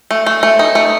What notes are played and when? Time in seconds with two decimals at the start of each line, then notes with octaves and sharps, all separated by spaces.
0.11 A3
0.26 A3
0.43 A3
0.59 D#4
0.75 A3